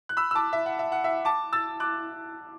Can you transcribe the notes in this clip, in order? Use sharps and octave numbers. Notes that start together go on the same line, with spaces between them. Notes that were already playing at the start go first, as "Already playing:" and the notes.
F#6
B5 E6
E6
A5 D6
E5
F#5
E5
F#5
E5
A5 D6
E6 A6
D6 F#6